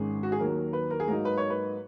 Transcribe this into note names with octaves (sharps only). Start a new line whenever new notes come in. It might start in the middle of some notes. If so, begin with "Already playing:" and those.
Already playing: G#1 G#2 D#3 G#3 C#4 G#4
F#4
G#4
D#2 D#3 F#3 A#4
B4
A#4
G#4
G#2 F#3 A#3 D#4 A#4
B4
C#5
B4